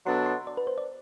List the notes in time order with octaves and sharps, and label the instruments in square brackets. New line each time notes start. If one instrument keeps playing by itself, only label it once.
[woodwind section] B2 F#3 B3 D4 A4 [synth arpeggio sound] C6
[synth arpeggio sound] C6
D5
B4
C5
D5